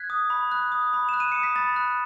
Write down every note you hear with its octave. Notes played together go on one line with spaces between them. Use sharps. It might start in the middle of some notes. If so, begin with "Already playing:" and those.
Already playing: F#6 G#6 B6
D#6
B5
F#6
D#6
B5
F#6 E7
D#7
D#6 C#7
B6
B5 A6
F#6